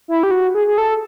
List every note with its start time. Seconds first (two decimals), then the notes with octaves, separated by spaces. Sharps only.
0.08 E4
0.23 G4
0.31 F#4
0.54 G#4
0.68 G#4
0.78 A4